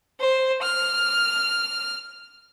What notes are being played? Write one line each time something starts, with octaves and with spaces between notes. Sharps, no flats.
C5
F6